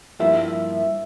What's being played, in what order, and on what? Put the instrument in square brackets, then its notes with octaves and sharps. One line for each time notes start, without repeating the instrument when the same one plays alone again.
[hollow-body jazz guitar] G2 F3 A#3 E4 [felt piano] E5